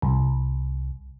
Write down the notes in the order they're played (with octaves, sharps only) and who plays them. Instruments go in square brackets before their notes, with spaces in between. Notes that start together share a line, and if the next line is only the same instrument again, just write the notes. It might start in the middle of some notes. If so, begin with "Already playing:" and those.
[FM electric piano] C2